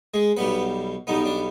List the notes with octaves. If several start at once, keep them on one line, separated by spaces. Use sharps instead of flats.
G#3 G#4
B1 B2 G3 B3 B4
B1 B2 G3 B3 D#4
D4